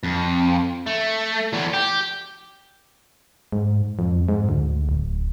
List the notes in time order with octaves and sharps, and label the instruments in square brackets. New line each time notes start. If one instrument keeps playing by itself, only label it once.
[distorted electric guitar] F2
A3
E2 A3
G4
[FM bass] G#2
F2
G#2
D2
D1